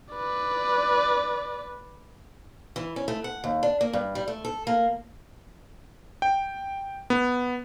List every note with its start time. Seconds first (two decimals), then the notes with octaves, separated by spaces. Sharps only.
0.14 B4 D5
2.76 E3
2.96 C#4
3.08 A3
3.24 F#5
3.44 D#2
3.63 D4
3.81 A#3
3.93 G2
4.15 G3
4.28 A3
4.45 A4
4.67 A#3
6.22 G5
7.10 B3